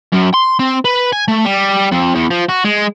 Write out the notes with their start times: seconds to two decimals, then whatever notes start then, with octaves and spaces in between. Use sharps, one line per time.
0.13 F#2
0.34 C6
0.59 C4
0.85 B4
1.12 G#5
1.28 A3
1.45 G3
1.92 F2
2.15 E2
2.31 F3
2.49 F#4
2.65 G#3